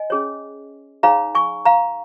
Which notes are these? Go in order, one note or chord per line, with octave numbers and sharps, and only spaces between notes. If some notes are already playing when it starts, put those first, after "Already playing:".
Already playing: D#5 G#5
C#4 G#4 C#5
D#4 G#4 C#5 F5 A#5
G#5 C#6
F5 A#5